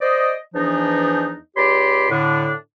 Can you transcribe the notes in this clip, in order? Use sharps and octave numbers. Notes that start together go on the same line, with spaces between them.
C5 D5 D#5
E2 E3 F3 D4 D#4
C#2 G4 C#5 D5 B5 C6
A2 D3 D4